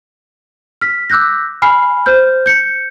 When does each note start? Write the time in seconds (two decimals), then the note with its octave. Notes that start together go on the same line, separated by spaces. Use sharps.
0.81 F6 B6
1.10 D6 E6 F#6 G6 A#6
1.62 G#5 B5 F6 C7
2.06 C5 F6 G6
2.46 G6 C#7